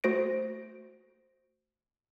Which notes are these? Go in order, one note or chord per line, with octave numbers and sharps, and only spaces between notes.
A3 F#4 C5 A#6 D7